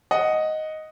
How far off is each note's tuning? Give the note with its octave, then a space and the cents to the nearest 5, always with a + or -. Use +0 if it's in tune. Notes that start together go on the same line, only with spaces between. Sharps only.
D#5 +0 F#5 +0